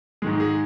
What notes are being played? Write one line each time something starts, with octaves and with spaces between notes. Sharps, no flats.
G#2 D#3 G#3 G#4
G#4